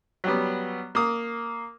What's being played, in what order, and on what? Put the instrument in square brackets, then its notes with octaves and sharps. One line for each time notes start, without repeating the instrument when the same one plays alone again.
[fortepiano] F#3 G3 B3
A#3 D#6